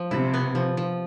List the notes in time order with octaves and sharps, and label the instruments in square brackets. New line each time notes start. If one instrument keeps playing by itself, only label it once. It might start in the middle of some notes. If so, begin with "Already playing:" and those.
Already playing: [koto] F3
[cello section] C3 [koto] E4
[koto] B3
F3
F3